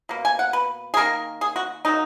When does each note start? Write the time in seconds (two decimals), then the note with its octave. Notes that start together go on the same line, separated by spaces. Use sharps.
0.09 B2 A#3
0.25 G#5
0.39 F#5
0.53 B4
0.94 G#4
0.97 D#3 A#3 A#4
1.41 G#4
1.56 F#4
1.85 D#3 F#3 A#3 D#4